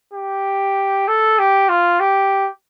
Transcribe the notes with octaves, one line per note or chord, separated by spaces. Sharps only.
G4
A4
G4
F4
G4